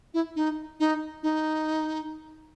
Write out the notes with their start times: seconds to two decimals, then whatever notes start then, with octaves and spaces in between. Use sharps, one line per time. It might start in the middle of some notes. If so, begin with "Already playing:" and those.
0.14 E4
0.36 D#4
0.80 D#4
1.23 D#4